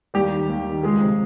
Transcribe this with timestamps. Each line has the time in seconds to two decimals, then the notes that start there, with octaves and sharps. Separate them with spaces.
0.14 D#2 G3 G4
0.32 D#3
0.49 D#2
0.67 D#3
0.83 C#2 G#3 G#4
1.01 C3 F3